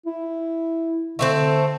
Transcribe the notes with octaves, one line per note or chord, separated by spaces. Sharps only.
E4
D3 A3 B3 C4